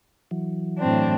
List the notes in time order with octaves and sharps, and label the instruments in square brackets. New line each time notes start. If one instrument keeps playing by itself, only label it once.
[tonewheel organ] E3 F#3
[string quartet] A2 C4 D4